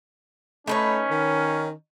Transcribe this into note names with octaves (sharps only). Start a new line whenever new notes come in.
A3 C#4 D#4 B4 C#5
D#3